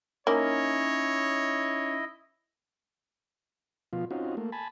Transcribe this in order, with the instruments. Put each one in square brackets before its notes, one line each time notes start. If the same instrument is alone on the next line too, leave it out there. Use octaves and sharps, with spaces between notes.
[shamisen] A#3 [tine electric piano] C#4 D#4 [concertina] E4 D#5 [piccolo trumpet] C#5
[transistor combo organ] B2 F3 F4
C4 C#4 D#4 F4 F#4
A3 A#3
G#5 A5 B5